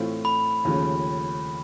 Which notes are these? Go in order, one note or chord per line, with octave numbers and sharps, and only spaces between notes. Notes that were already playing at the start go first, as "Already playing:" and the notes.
Already playing: A2 E3 A3 C4 F4
B5
D#2 C#3 F3 A3 C#4